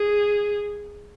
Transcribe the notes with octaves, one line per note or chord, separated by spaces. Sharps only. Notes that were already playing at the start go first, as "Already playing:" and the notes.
Already playing: G#4